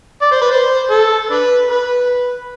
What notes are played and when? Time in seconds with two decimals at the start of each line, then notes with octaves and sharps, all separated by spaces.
0.22 D5
0.32 C5
0.41 B4
0.51 C5
0.90 A4
1.30 D4 B4
1.70 B4